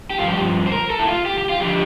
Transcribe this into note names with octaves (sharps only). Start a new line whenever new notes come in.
G4
G2 F3 F4
G4
C5
A#4
A4
E4
F4
G4
G4
F4
D3 F3 G4